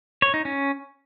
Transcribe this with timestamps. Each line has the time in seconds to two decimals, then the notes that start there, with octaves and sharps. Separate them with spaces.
0.22 C#5
0.34 D#4
0.45 C#4